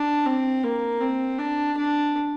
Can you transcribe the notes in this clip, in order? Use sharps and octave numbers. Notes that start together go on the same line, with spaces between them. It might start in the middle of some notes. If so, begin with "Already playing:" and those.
Already playing: D4
C4
A#3
C4
D4
D4